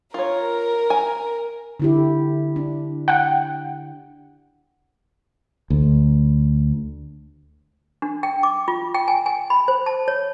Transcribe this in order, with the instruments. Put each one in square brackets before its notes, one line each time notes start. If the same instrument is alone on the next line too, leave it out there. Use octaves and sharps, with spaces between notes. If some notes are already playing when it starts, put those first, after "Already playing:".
[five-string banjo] F4 C#5 [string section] A#4
[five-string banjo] G#5
[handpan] D3 E4 G4
D4
[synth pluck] F#5 G5
[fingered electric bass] D2
[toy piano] D4
G5
D6
F4
G5
G#5
G#5
B5
C5
A5
C#5